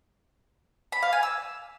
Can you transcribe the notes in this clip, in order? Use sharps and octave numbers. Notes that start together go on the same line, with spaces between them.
B5
F5
G#5
E6